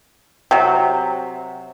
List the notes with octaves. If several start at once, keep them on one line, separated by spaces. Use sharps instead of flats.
C3 F#3